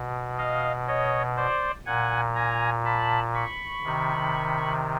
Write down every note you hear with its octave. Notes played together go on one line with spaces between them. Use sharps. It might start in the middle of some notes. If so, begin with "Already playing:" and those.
Already playing: B2
D#5 F5
C#5 D#5
C5 D5
A#2 F#5 G#5
G#5 A#5
A5 B5
B5 C#6
C3 D#3